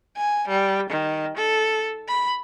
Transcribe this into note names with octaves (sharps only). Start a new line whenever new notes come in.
G#5
G3
D#3
A4
B5